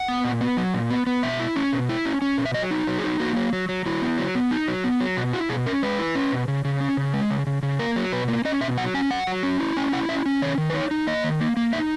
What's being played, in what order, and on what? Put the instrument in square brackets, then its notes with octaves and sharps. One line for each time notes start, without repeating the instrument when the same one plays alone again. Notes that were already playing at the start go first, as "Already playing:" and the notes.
Already playing: [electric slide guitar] F#5
B3
A#2
B3
F#3
A#2
B3
B3
B2 E5
E4
C#4
B2
E4
C#4
C#4
B2
E5
F#3 D#5
D#4
F#3
G#4
D#4
A#3 F#4
F#3
F#3
F#3
F#3 E4
B3
F#3
B3
D#4
F#3
B3
F#3
B2 F#4
E4 F#4
B2 G#4
C#4 A#4
G#3 B4
E4
C#4
B2
C#3
C#3
C#4
C#3
G#3
C#3
C#3
C#3
A#3 A#4
F#3
B2 B4
A#3
C#4 D#5
B2 E5
F#3 F#5
C#4 G#5
F#3 F#5
F#3
C#4
E4
C#4 G#5
E4 F#5
C#4 E5
C#4
D#3 C#5
D#3
B4
D#4 C#5
D#4
A#3 D#5
D#3
A#3
A#3
D#4 E5